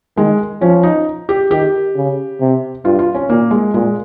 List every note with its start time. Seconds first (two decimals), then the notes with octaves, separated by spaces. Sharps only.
0.17 D#3 G#3
0.61 F3 C#4
0.83 D#4
1.29 G4
1.51 D#3 G4
1.96 C#3
2.40 C3
2.85 G2 F4
2.99 F4
3.15 C#4
3.30 A#2 A#3
3.51 G#3
3.74 A#2 G#3